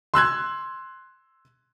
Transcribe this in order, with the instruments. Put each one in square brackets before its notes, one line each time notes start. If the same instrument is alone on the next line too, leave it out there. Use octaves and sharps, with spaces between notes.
[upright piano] C6 E6 F#6 G#6